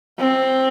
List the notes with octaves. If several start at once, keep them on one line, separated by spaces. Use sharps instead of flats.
C4